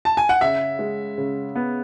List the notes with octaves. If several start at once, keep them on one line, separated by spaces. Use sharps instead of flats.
A5
G#5
F#5
C#3 E5
G#3
C#3
B3